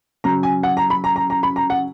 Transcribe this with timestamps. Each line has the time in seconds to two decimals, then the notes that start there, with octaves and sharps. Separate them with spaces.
0.24 C#3 F#3 A#5
0.43 G#5
0.63 F#5
0.77 A#5
0.90 B5
1.04 A#5
1.16 A#5
1.30 A#5
1.43 B5
1.56 A#5
1.70 F#5